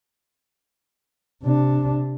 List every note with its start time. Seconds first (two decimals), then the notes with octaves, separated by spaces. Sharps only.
1.43 C3 D4